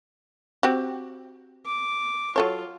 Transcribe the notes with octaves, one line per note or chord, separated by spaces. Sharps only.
C4 F#4 G4
D6
F#3 F4 A4 C#5